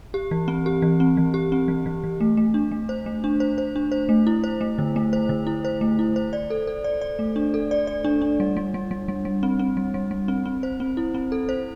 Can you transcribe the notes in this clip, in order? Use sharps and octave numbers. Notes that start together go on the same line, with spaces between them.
G4
E3
C4
G4
E3
C4
E3
G4
C4
E3
E3
E3
A3
A3
D4
A3
C5
A3
D4
C5
C5
D4
C5
A3
E4
C5
A3
D3
A3
C5
D3
E4
C5
A3
E4
C5
D5
A4
A4
D5
D5
A3
D4
A4
D5
D5
D4
D4
G3
G3
G3
G3
G3
G3
C4
C4
G3
G3
G3
C4
C4
C5
C4
E4
C4
A4
C5